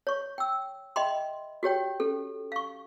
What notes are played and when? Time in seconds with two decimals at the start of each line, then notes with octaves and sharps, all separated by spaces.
0.07 C#5 C#6
0.38 G5 E6
0.96 D#5 E5 G5 B5 C6
1.63 F#4 G4 C#5 G5
2.00 C#4 G4 A4
2.52 F5 C#6